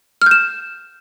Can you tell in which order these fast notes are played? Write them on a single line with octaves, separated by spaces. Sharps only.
F6 G6 E7